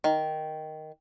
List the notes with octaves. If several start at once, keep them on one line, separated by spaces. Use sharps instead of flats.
D#3